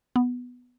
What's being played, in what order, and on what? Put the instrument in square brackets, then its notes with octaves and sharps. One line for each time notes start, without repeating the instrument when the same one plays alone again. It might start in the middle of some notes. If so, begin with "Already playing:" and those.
[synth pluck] B3